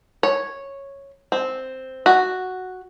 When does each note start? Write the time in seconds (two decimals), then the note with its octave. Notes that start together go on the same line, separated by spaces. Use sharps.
0.23 C#5
1.32 C4
2.06 F#4